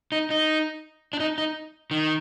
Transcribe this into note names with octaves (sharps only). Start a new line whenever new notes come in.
D#4
D#4
D4
D#4
D#4
D#3